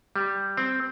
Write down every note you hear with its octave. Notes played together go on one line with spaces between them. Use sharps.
G3
C4